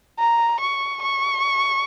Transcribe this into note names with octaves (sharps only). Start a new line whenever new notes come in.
A#5
C#6
C#6